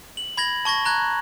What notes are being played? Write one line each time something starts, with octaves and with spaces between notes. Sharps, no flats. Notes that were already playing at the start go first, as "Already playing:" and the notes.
F#7
B5 G#6 A#6 F#7
A5 C#6 G#6 A#6
A#5 F#6 G#6